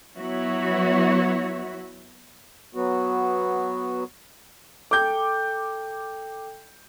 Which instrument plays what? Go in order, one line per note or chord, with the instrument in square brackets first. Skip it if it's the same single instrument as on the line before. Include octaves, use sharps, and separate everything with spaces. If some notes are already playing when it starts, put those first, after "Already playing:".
[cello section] F#3 B3 E4 F#4 C#5 E5
[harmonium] F#3 B3 F#4
[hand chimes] A4 G5 [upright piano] D6 G6